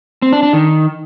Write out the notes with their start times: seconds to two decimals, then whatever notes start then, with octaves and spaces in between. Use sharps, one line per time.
0.22 C4
0.33 D4
0.43 D4
0.53 D#3